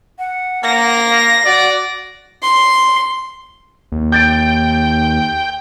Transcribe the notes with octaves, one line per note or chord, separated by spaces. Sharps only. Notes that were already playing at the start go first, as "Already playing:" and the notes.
F#5
A#3 A#6
F5
F#4 D5
C6
D#2
G5 G6 A6 D7